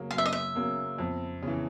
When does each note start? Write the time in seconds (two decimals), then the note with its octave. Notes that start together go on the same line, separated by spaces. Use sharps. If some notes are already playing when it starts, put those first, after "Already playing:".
Already playing: C#3 F#3 A#3
0.11 F#2 F5
0.18 E5
0.26 D#5
0.33 E5
0.55 C#3 F#3 A#3
0.98 F2
1.42 C#3
1.47 E3